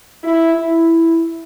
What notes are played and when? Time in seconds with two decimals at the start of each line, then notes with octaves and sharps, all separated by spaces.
0.24 E4
0.55 E4